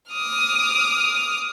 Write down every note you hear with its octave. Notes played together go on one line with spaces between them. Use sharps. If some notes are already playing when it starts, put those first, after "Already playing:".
D6 D#6 F6